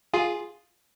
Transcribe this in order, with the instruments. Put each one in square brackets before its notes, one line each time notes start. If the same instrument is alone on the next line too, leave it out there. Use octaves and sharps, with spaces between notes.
[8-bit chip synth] F4 G#4